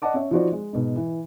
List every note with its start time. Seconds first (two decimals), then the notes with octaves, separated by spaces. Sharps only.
0.02 D5 D#5 F#5 A5 D6
0.14 C#4 C#5 E5
0.31 F3 D#4 F4 F#4 C5 D5
0.52 G#3
0.73 G#2 B2
0.96 E3